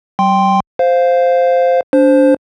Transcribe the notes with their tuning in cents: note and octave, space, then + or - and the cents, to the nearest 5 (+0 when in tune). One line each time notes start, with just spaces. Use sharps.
G3 -45 G5 +0 C6 +0
C5 -5 F5 +0
D4 -25 C5 +0